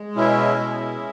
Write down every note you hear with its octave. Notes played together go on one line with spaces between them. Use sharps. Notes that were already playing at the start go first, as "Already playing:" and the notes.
Already playing: G#3
B2 C#4 E4
G#3